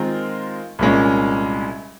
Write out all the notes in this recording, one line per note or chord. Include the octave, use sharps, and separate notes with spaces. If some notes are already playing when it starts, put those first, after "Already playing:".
Already playing: D#3 G#3 C4 F4 A#4
C2 A#2 G#3 C#4